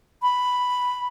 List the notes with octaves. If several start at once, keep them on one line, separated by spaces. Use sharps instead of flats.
B5